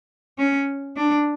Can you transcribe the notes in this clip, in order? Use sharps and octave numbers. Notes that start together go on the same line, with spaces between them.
C#4
D4